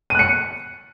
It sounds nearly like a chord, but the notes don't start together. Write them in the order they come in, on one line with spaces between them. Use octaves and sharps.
D#7 F#6 C#7